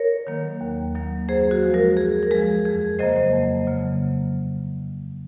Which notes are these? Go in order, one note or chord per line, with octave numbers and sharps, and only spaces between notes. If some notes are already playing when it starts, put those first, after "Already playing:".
Already playing: A#4 C#5
D#3 F#3 A#3
D#2
D#3 F#3 A#3
F#2 G#4 C5
F#4
F3 G#3
F#4 A#4
F#2 G#4
A#4
F3 G#3 G#4
F2 G#4
C#3 F#3 A#3 C5 D#5
C5 D#5
F2
C#3 F#3 A#3